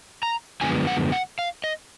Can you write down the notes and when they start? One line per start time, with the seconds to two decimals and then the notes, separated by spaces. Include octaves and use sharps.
0.23 A#5
0.61 F#2 D3 F3 G#3 B3 G#5
0.87 F#5
1.12 F#5
1.39 F5
1.64 D#5